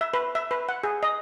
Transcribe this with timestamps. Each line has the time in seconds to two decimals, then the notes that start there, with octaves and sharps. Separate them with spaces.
0.01 E5
0.14 B4
0.35 E5
0.51 B4
0.69 F#5
0.84 G#4
1.03 D#5